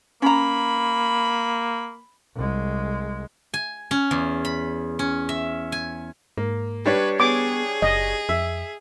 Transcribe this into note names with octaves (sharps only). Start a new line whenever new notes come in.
A#3 C#4 A#5 B5
C2 G#3
G#5
C#4
E2
B5
C#4
E5
G#5
G#2 A#3
G3 D4 B4 C#5
B3 G#4 D6
F#1 D#5
F2 E5